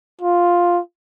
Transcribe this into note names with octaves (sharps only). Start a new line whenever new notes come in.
F4